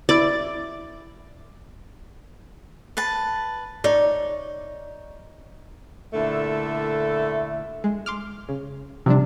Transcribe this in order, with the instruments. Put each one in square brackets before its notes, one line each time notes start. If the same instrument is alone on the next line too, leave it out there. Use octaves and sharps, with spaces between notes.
[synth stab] E4 D6 A6 [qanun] D5
[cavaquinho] B4 A5
[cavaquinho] D#4 C#5 [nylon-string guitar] D5
[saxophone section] A#2 D3 A3 E4 A4 E5
[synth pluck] G#3
C6 D6 F6
C#3
[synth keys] C3 [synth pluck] F3 G3 D4